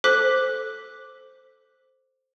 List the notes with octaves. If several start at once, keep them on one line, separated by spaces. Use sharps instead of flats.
A4 C5 D6 F#6 B6